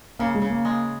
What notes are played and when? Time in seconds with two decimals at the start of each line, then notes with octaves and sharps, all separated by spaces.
0.19 C#3 A#3
0.35 G#3
0.42 C#3
0.50 A#3
0.65 G#3